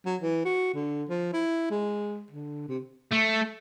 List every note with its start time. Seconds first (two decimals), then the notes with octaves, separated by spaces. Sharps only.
0.06 F#3
0.21 E3
0.45 F#4
0.74 D3
1.09 F3
1.33 E4
1.71 G#3
2.31 D3
2.68 C3
3.11 A3